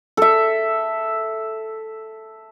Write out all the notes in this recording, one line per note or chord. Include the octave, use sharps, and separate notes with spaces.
A4 E5